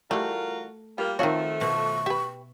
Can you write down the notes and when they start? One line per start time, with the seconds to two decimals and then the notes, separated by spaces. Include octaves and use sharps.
0.11 E3 G3 A3 F4 F#4 A#4
0.98 G3 A#3 F4
1.19 D#3 F3 A3 C4 F4 F#4 C#5
1.61 B2 C#6
2.06 G4 B4 E5